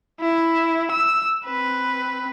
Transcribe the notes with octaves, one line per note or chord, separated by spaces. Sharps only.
E4
E6
C4 B4